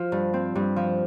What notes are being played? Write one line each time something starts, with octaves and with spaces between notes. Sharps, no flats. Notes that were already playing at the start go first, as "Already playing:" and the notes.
Already playing: F3 F4
G2
C4
G2
F3